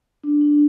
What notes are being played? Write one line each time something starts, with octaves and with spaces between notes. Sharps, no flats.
D4
D4